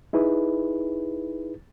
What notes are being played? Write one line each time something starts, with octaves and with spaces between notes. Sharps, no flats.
D#4 E4 G#4 B4